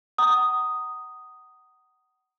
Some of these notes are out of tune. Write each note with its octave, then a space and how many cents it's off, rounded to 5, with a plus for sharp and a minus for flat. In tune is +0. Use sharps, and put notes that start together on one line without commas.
F#5 +30 A#5 +0 D#6 +0